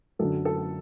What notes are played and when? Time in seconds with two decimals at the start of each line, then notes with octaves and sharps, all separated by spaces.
0.19 F#2 D3 A4
0.45 A4